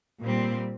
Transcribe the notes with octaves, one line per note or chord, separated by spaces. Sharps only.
A#2 G3 C4